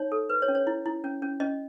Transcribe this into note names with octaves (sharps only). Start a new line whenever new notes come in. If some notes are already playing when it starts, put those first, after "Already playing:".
Already playing: D#4 C#5
A4
B4
C#5
C#4
C#5
E4
E4
C#4
C#4
C#4 D#5